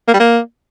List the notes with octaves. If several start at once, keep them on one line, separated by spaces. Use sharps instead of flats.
A#3
G3
A#3